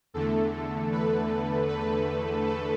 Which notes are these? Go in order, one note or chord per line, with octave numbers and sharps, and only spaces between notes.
E2 D3 A3 A4
B4
B4
A4